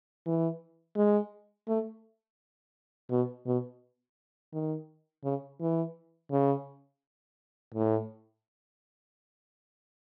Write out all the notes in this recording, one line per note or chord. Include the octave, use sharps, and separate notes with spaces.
E3
G#3
A3
B2
B2
D#3
C#3
E3
C#3
A2